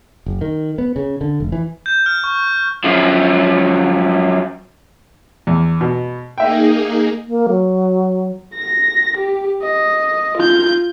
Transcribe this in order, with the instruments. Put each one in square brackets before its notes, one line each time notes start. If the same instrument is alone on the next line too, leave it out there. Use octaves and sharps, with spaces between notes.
[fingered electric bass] F#1
D#3
B3
C#3
D3
F1
E3
[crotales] G6
F6
C#6
[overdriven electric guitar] F#2 F3
[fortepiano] E2
B2
[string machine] A#3 D#4 G#4 [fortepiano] E5 G5
[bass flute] A#3
F#3
[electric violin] A#6
G4
D#5
F4 G6